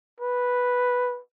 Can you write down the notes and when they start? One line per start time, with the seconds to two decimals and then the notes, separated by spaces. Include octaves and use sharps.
0.20 B4